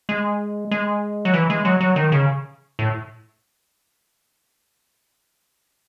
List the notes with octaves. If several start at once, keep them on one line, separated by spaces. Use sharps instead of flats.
G#3
G#3
F#3
E3
G#3
F#3
F#3
D#3
C#3
A2